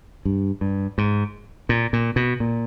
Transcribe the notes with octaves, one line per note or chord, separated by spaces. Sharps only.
G2
G2
G#2
A#2
A#2
B2
A#2